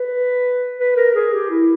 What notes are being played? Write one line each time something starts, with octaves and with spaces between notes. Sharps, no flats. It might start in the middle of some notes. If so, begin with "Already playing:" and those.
Already playing: B4
B4
A#4
G#4
G4
E4